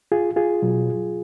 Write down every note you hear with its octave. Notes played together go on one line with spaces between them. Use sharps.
F4 G#4
F4 G#4
B2 F#3